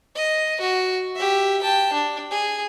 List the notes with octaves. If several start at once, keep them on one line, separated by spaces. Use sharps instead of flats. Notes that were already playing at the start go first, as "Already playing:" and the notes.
D#5
F#4
G4 E5
G5 A5
D4
G#4